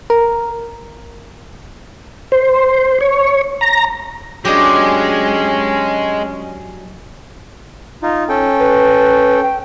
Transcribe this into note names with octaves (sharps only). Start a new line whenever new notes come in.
A#4
C5
C#5
A#5
F#3 G#3 C#4 D4 G4 D#5
D#4 F4
C#4 A4 G5
B4
G5